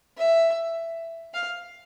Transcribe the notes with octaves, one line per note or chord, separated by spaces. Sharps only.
E5
F5